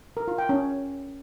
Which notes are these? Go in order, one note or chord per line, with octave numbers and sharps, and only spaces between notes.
A#4
F4
G5
C#4